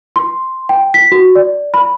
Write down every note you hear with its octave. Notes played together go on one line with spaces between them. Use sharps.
C6
G5
B6
F#4
D5
B5